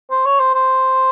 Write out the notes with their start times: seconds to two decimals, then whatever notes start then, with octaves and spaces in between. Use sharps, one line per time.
0.11 C5
0.26 C#5
0.40 C5
0.54 C5